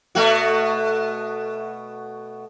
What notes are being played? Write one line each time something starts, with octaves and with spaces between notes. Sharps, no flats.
B2 A3 F#4